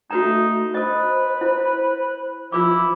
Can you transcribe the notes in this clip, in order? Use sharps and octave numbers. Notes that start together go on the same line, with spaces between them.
A3 D#4 F#4 B4 A#5
B4 C5 D#5 D#6
E4
F3 E4 F4 B4 D6